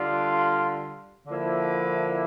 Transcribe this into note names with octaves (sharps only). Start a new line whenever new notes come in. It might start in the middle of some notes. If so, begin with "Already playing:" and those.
Already playing: D3 G3 D4 F4
D3 F3 A#3 E4